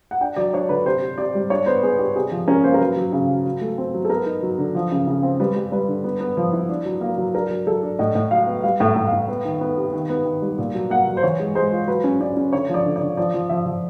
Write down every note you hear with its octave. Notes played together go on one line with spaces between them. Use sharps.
F#5
D4 G5
F#3 D5
D4 C#5
D3 B4
C3 C5
C3
C3 D5
G3
D4 C#5
B3 C5
B3 G#4
D4 G4
C3 G#4
F3
C#4 A#4
A#3 C5
A#4
F#3 B4
F#3
C#3
F#3
F#3
A3
C4
F#3
A4
B3 A#4
D#4
F#3
D3
F3
C#3
C#3
C4
G3 B4
G3
G3 B4
D3
B3
B3
F3
E4
D4
F#3
A#3
F#3
D4 A#4
F#3
F#3 A4
D4
A2 D#5
A2
F#3 F5
B3
G3 F5
A2 E5
A2
F5
A2
B3
D#3
B3
C3
D#3
B3
D#3
G3
A#2
F#3
A#3 F#5
F#3
C5
E3 C#5
G#3
G#3 C5
F4
F#3 B4
C#4
C#4 D5
C#4
D3 C#5
F3 D5
D3
D5
D3
F3 D5
F3
F3 E5
F3